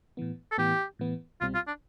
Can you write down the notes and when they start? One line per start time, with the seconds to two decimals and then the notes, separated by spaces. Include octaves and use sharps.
0.17 A2 E3 B3
0.52 A4
0.58 A2 E3 B3 G4
0.99 A2 E3 B3
1.41 C2 B2 G3 C4 F4
1.55 F4
1.67 D4